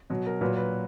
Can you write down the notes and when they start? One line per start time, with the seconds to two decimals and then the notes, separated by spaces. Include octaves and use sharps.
0.10 B2 F#3
0.26 A#4
0.41 A#2 F#3 B4
0.57 B4